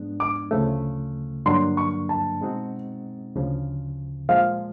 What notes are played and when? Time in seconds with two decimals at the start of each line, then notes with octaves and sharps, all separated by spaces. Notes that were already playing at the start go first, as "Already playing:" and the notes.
Already playing: G#2 F3 G#3 B3 D4
0.20 D6
0.51 D2 C#3 F3 A3
1.46 G2 D3 F#3 A#3 D4 C6
1.77 C#6
2.09 A5
2.41 B2 G#3 C4 D#4 F#4
3.36 D2 C#3 F3
4.29 A#2 F3 G#3 F5